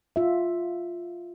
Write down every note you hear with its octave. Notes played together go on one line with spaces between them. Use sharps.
F4 E5